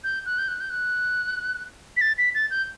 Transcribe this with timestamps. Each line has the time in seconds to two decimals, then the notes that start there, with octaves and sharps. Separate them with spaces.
0.04 G6
0.26 F#6
0.38 G6
0.48 F#6
0.60 G6
0.70 F#6
1.97 B6
2.01 A6
2.18 B6
2.35 A6
2.50 G6